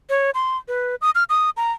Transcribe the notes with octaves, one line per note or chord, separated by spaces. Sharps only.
C#5
C6
B4
D#6
F6
D#6
A#5